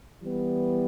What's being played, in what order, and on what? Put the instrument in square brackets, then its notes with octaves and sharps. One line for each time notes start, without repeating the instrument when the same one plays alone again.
[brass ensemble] E3 G3 B3